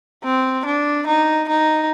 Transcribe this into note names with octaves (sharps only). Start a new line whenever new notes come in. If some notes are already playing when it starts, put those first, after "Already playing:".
C4
D4
D#4
D#4